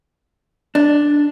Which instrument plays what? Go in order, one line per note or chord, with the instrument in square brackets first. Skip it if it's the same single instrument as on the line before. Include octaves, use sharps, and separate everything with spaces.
[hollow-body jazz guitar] D4